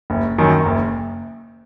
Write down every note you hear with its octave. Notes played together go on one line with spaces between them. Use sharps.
F#1
F#2 D#3
F#1